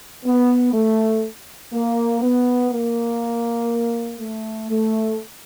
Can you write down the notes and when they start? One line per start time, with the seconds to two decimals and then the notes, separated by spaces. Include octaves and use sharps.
0.24 B3
0.73 A3
1.72 A#3
2.21 B3
2.71 A#3
4.18 A3
4.68 A3